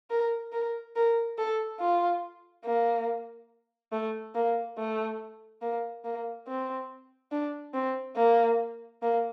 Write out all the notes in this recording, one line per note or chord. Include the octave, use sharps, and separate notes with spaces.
A#4
A#4
A#4
A4
F4
A#3
A3
A#3
A3
A#3
A#3
C4
D4
C4
A#3
A#3